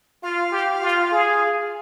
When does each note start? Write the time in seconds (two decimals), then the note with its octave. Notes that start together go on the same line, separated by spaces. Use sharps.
0.23 F4 F5
0.52 G4
0.83 F4
1.12 G#4